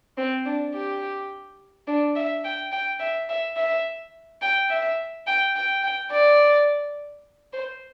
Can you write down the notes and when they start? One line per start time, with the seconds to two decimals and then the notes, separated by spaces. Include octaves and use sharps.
0.17 C4
0.46 D4
0.74 G4
1.87 D4
2.16 E5
2.44 G5
2.72 G5
3.00 E5
3.29 E5
3.57 E5
4.42 G5
4.70 E5
5.27 G5
5.56 G5
5.83 G5
6.11 D5
7.53 C5